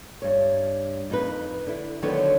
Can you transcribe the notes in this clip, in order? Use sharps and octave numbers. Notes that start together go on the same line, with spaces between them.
G2 C#5
F2 D#4 B4
D3 E4
D3 D#3 F3 F#3 B3 C#5